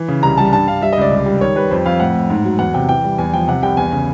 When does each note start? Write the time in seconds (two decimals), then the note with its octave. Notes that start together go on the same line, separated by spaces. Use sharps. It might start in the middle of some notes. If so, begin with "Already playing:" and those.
Already playing: E3
0.08 C#3
0.23 C2 A#5
0.37 G3 A5
0.52 G2 A5
0.67 G2 F5
0.82 G3 E5
0.93 D#5
0.97 C#2 D5
1.11 C2
1.26 G3
1.41 D#3 C#5
1.56 G3 B4
1.71 F2 C5
1.86 F2 F5
2.00 A2 F#5
2.15 A2
2.30 G#2
2.45 F#3
2.59 E2 F#5
2.74 C3 G5
2.88 E3 G5
3.04 G3
3.18 E2 G#5
3.34 F3 G5
3.48 C3 F#5
3.62 C2 G5
3.77 E2 G#5
3.92 C#3